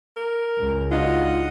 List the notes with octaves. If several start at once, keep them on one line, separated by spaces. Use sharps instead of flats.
A#4
C#2
D4 D#4 F4 F#4 D#5 F#5